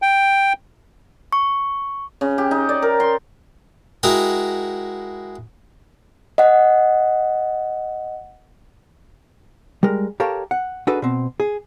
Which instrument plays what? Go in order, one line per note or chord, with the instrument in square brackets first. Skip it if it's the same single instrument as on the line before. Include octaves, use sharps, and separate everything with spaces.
[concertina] G5
[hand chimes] C#6
[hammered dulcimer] C#3
G4
D#4
D5
A#4
C6
[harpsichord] G#3 E4 F#4 A#4 F#5 G5
[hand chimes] D#5 F#5
[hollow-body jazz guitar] G3 G#3 A#4
G4 A4 A#4 C#5 F5 A5
F#5
D4 D#4 F#4 G#4 A4 B4
B2 C4
G#4